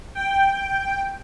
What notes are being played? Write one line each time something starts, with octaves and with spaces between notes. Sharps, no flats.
G5